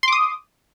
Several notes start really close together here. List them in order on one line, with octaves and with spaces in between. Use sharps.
C6 D6 D#6